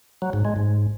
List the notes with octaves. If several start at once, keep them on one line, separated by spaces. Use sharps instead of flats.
F#3
G#2
G#3
G#2